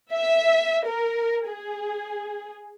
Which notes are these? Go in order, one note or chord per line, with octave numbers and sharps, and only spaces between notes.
E5
A#4
G#4